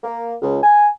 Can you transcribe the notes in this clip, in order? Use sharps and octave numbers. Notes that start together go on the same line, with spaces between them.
A#3
C#2
G#5